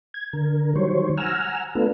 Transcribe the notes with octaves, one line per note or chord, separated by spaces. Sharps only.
G#6
D3 A#4
D#3 F#3 G3 C5 C#5
F#5 G#5 A#5 E6 F6
A3 B3 D4 F4 A4 B4